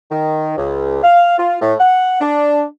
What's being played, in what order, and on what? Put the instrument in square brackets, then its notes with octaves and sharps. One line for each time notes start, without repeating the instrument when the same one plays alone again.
[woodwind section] D#3
C#2
F5
F4
A2
F#5
D4